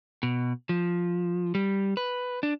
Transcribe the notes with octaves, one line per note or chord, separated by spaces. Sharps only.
B2
F3
G3
B4
D4